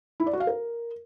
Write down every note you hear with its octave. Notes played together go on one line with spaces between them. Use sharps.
E4
D5
F#4
F5
A#4